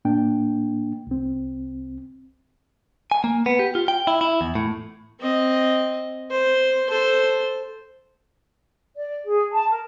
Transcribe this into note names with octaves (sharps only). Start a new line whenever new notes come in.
A2 A#3 D4 G5
C2 C4
G#5
A#3
B3
G4
F4
G5
E4
E4
E2
A2
C4 D#5
C5
A4 C5
D5
G#4
A5
A#4